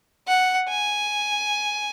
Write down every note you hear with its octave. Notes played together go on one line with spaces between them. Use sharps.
F#5
G#5